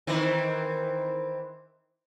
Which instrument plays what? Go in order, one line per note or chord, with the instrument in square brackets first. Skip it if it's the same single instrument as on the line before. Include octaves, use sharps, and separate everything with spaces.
[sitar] D#3 E3 C4